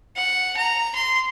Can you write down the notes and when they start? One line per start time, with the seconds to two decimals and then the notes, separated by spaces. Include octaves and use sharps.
0.17 F#5
0.57 A#5
0.95 C6